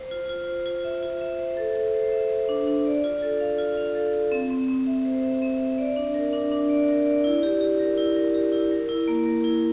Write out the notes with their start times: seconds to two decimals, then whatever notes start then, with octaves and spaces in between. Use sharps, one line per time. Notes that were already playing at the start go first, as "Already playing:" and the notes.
Already playing: C5
0.11 F4
0.29 F4
0.47 C5
0.66 F4
0.84 E5
1.03 F4
1.21 E5
1.39 C5
1.57 A4
1.75 A4
1.94 C5
2.12 E5
2.30 C5
2.49 D4
2.67 D4
2.86 D5
3.04 F4
3.22 A4
3.40 F5
3.58 F4
3.77 F5
3.95 A4
4.13 A4
4.32 C4
4.50 C4
4.68 C4
4.87 E5
5.05 C5
5.23 E5
5.42 C4
5.59 E5
5.78 D5
5.96 D4
6.14 A#4
6.33 D4
6.51 D4
6.70 D5
6.89 A#4
7.06 D5
7.24 E4
7.43 G4
7.61 G4
7.79 A#4
7.98 E4
8.16 A#4
8.34 G4
8.52 E4
8.71 A#4
8.89 E4
9.08 A#3
9.26 A#4
9.44 E4